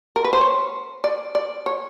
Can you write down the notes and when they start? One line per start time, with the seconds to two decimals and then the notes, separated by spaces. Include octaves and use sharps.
0.16 A#4
0.24 B4
0.33 C5
0.41 C#5
1.04 D5
1.35 D5
1.66 C#5